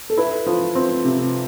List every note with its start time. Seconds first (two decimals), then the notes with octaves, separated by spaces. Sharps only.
0.10 A4
0.17 E4 B4
0.46 F3
0.75 C4
1.04 C3